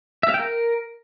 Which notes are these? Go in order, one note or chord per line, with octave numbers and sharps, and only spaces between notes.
E5
F5
G5
A#4